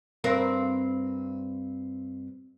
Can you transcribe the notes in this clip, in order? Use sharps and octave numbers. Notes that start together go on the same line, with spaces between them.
G2 C4 A#4